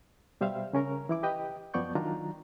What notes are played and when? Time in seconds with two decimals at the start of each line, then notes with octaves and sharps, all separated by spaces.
0.41 B2 G3 C5 E5 F5
0.73 C#3 C#4 A#4 A#5
1.09 E3 E4 D6
1.23 G4 B4 D#5 G5
1.74 F#2 F3 B3 D5 C#6 G6
1.95 D#3 F#3 D4 F4 A#5